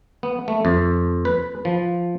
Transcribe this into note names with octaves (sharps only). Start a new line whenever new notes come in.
B3
A3
F2
B4
F3